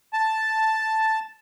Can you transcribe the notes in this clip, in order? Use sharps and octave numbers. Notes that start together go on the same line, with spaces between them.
A5